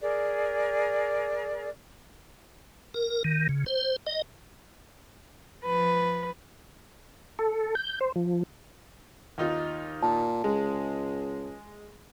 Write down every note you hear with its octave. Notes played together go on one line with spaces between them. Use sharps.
G#4 A#4 D5
A#4
D#3
C#3
C5
D#5
F3 B4
A4
G6
C5
F3
D#2 D#4 F4
A#2 A5
C#2 G#3